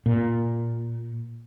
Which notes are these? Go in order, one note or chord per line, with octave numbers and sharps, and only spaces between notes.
A#2